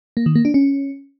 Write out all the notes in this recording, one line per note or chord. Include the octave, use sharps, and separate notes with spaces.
A#3
D#3
A#3
D4
C#4